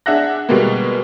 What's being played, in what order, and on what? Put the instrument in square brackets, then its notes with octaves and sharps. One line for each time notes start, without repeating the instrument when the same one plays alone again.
[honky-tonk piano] D4 G#4 E5 F#5 F#6 A#6
B2 G3 G#3 A#3